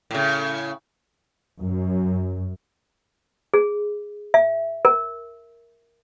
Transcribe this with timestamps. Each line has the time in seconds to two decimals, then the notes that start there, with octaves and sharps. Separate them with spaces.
0.11 A2 C#3
1.60 F#2
3.54 G#4
4.34 E5
4.85 A#4